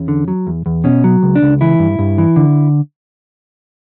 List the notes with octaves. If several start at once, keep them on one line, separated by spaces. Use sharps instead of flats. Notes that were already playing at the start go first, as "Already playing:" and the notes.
Already playing: E2 C#4
D3
F#3
E2
E2
B2 C#4
F#3
C#2
D4
C#2
E3 E4
G2
G2
E3
D3